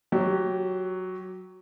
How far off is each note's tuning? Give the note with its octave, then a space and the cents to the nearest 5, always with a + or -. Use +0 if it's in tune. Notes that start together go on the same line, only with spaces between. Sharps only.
F#3 +0 G4 -15